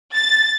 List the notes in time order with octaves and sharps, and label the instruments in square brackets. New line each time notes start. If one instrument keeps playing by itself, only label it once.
[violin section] A6